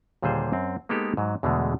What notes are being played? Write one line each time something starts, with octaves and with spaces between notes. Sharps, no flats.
D#2 A#2 D3 G3 G#4 C5
F#2 C4
G#3 A#3 B3 D#4 G4 A4
G#2 F#3
E2 B2 D3 G#3 A3